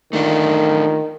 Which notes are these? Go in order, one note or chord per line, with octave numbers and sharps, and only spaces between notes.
D#3 A3 D4 F4